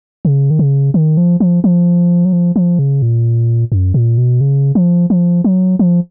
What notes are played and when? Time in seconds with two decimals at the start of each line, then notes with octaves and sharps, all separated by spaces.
0.25 C#3
0.50 D#3
0.59 C#3
0.94 D#3
1.17 F3
1.40 F3
1.64 F3
2.25 F#3
2.33 F3
2.56 F3
2.79 C#3
3.02 A#2
3.72 F#2
3.94 A#2
4.18 B2
4.41 C#3
4.75 F3
5.10 F3
5.44 F#3
5.79 F3